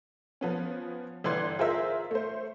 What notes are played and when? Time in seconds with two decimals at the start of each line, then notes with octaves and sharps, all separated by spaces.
0.41 F3 B3 C#4
1.24 G1 E3 D5 C6 F#6 G#6
1.59 F4 G#4 A#4 C5 E5
2.11 A3 C5